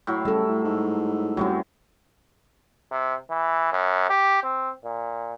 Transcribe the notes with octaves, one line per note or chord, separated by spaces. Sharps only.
A2 F#3
C#3 G3 A4 E5
A2
G#2
F#2 C3 F#3 G3 A3 F#4
C3
E3
F#2
G4
C4
A#2